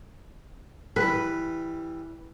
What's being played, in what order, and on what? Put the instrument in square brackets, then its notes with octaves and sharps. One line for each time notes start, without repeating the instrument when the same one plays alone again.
[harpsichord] E3 G3 [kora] B4